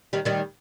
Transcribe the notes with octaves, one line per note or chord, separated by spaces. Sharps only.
D#3 G3
D#3 G3